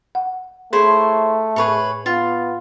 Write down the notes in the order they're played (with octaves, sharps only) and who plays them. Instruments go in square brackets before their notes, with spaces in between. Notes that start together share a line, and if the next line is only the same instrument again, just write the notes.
[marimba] F#5
[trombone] A3 [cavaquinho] E4 C5 C#5 [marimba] G#4
[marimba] A2 C#6 [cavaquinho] G#4 B4 C#5
[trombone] B3 [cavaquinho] F4